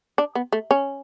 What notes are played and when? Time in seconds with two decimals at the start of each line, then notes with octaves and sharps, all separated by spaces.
0.18 D4
0.35 B3
0.52 A3
0.71 C#4